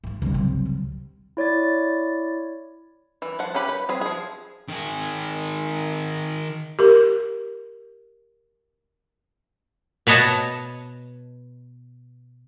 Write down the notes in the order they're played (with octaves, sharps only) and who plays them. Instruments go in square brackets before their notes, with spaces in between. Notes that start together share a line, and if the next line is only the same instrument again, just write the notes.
[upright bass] G#2 G#3
[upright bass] G1 [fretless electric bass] C#2 C3 G3
[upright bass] F#3 C4
D3
[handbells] E4 C#5 D5 A6
[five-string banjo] E3
F3 F#5
C#4 G4 B4 B5
B4
C4 G#4 B4
F3 G#4
[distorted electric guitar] D#3 G#4
[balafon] G4 A#4
[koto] B2 B4 C#5 D#5 A5